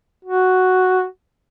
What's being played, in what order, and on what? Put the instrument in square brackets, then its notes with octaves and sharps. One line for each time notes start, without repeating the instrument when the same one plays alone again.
[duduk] F#4